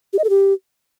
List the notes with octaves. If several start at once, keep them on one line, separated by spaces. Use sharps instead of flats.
G4
D#5
A4
G4